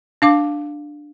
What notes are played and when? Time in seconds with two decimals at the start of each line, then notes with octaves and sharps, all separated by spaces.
0.22 D4 F5 D6